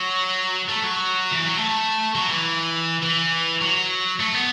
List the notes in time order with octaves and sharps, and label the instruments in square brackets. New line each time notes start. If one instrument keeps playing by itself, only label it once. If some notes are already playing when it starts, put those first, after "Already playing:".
Already playing: [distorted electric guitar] F#3
A3
F#3
E3
F#3
A3
F#3
E3
E3
F#3
A3
B3